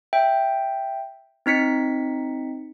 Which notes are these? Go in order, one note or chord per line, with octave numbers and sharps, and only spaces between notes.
E5 G5
C4 D#4 B6 C#7